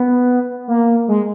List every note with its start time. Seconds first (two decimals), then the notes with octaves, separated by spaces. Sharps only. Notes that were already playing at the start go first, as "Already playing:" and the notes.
Already playing: B3
0.68 A#3
1.08 G#3